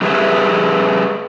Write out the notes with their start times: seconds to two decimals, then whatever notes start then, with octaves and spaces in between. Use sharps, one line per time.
0.01 G3 G4 G#4 B4 E5